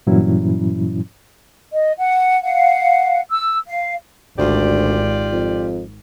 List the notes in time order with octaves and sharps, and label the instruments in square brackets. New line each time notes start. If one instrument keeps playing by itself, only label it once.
[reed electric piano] G2 A#2 E3 F#3 C#4 E4
[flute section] D#5
F#5
F5 F#5
E6
F5
[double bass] G#1 [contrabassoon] D2 [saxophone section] F4 G4 D5
[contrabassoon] F2